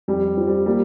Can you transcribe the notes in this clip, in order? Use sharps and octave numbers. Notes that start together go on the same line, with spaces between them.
F2 G3
F3
G3
G3 A#3